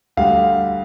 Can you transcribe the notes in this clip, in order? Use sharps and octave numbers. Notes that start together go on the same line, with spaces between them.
D2 D3 G3 F5